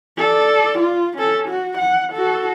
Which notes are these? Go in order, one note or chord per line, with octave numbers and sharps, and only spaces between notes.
A4 D5
F4
C#4 A4
F#4
F#5
F#4 A4